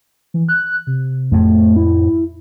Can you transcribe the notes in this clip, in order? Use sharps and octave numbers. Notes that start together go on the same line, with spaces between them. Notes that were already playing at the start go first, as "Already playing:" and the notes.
E3
F#6
C3
F2 A2 F3 A3
E4